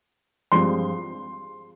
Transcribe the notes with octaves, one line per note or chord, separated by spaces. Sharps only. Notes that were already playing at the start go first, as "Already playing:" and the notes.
G2 F3 G#3 C4 C6